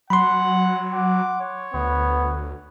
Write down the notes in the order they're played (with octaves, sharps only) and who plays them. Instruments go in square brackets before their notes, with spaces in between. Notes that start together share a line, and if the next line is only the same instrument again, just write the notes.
[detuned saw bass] F#3 [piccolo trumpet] F#5 [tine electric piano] B5 C6
[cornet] F#5 [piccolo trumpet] D6
[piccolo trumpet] C#5
[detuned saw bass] D2 [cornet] B3